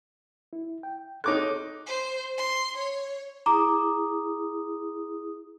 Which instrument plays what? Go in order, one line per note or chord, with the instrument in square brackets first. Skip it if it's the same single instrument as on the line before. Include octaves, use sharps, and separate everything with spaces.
[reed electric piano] E4
G5
[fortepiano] D#4 D6 F#6 [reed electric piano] A4 C#5
[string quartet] C5
C6
C#5
[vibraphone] E4 G#4 D#6 [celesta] A#5 D6